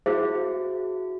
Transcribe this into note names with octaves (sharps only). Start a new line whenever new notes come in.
E4 F#4 G#4 C5 F5